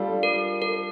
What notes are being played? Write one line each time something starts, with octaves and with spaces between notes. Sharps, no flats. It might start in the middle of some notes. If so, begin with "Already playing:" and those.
Already playing: G3 D4 F4 A4
A#4
A#4